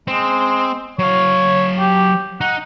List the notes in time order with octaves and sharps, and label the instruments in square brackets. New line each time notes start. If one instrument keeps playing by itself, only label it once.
[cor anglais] G#3 [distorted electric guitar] C4
[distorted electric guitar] F#3 F5 [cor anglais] C#5
[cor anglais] G4
[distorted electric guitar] D#4 [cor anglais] F#5